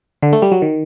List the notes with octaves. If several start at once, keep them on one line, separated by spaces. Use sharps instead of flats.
D3
A3
G3
F#3
D#3